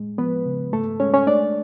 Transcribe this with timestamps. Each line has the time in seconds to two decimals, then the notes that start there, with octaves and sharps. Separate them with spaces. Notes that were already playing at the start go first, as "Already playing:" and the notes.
Already playing: A2 G#3
0.18 F3 B3 B4
0.46 C#3
0.73 G#2 A3 A4
1.00 G#3 C#4 C#5
1.14 C#4 C#5
1.27 A3 D4 D5